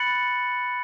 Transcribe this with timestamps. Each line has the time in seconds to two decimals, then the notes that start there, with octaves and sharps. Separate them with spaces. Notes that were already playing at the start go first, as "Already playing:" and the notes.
Already playing: B5 F#6 A6 C#7 F#7